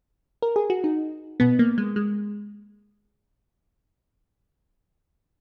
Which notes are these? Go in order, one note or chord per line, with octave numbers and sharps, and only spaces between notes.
A#4
G#4
F#4
D#4
B2 B3
A#3
G#3
G#3